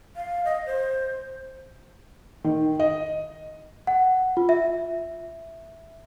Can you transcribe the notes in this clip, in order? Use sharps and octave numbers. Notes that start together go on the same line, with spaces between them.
F5
D#5
C5
D#3
D#5
F#5
F4
E5